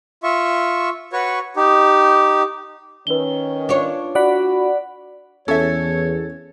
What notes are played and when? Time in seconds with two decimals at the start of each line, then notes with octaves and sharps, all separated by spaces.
0.23 F4 E5 C#6
1.13 F#4 B4 C#5 C#6
1.56 D#4 G4
3.07 D#3 C#4 B4 G7
3.69 D4 F4 C#5
4.15 F#4 D5 F#5 B5
5.48 E2 C#4 A4 C#5 E5